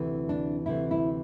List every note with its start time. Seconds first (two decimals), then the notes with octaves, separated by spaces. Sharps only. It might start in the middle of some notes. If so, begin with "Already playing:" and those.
Already playing: D2 C3 E3
0.29 D4
0.66 D2 C3 E3 E4
0.91 E4